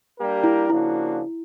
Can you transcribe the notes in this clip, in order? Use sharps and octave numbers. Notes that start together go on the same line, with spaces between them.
G3 A#3 D4 G4 A#4
E4
C#3 F3 A#3 D4 E4 F#4